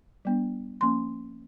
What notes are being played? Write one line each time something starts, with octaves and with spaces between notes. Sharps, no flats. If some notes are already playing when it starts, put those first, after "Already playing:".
G3 B3 D4
F3 A#3 C#4 C6